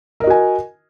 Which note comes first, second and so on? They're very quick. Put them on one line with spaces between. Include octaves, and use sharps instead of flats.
A#4 D#5 F#4 G#5